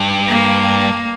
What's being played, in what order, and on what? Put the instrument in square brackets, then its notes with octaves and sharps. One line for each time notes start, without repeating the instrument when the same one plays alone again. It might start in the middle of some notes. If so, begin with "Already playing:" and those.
Already playing: [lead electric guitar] G2
[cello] A#3